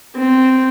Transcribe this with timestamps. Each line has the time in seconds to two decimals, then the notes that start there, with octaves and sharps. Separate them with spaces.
0.17 C4